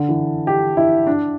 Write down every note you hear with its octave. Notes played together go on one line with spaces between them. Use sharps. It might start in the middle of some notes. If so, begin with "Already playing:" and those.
Already playing: D3
E3
G4
E4
D4